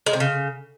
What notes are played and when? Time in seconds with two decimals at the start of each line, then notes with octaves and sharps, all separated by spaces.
0.06 G#3
0.13 C3
0.20 C#3